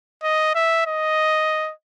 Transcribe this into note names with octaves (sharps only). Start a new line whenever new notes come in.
D#5
E5
D#5